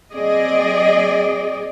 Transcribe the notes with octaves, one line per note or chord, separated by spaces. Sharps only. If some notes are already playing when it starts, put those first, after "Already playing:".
F#3 C4 G#4 D5 D#5